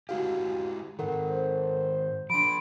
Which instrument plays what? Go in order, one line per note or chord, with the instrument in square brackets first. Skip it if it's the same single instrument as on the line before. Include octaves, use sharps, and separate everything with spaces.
[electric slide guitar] G#3 E4 G4 [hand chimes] F#4 F5
[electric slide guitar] G#2 D#3 [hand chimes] A4 A#4 F#5
[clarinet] C5
[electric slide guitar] F3 D4 [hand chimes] B5 C6 [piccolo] D7